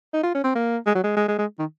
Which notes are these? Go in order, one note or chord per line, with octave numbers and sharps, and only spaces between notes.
D#4
F4
C#4
C4
A#3
G#3
F#3
G#3
G#3
G#3
G#3
D#3